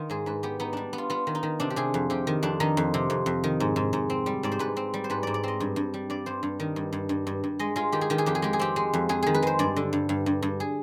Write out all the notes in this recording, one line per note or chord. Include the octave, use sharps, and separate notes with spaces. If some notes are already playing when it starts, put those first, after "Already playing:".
Already playing: D#3 F4
G#2 G#4
G#2 B4
B3 G4
B3 D#4
G3 D4
B3
F4
B3 F4
D#3
D#4
D#3
C3 D4
G4
C3 G#4
F2
C3 G4
D#3
F2 D4
D#3 D#4
F2
C3
F2
F2
D#3
G#2
G#2
G#2
C4
G3
G#2 D5
C5
G#2 B4
C4
G3
C5
G#2 B4
G#2 D5
D5
C4 D#5
G2
G2
G3
G2 D5
G2 C5
G2
D#3
G2
G2
G2
G2
G2
G#3 D#5
G#3 F4
D#3 G4
G#4
D#3 G4
G#4
F2 G4
G#4
G#3 G4
G#4
C4 G4
G#3
F2
F2 G#4
D#3 G#4
B4
G#3 C5
G2 D5
D3
G2
G2
G2
G2
G#4